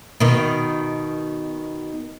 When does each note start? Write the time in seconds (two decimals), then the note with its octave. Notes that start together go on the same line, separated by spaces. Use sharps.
0.20 B2 D#3